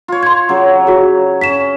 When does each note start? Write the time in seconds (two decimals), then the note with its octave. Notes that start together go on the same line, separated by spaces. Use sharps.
0.08 F4 C#5
0.23 C6 G#6
0.49 C#3 F#3
0.87 F#4 G#4
1.41 C#4 B6 E7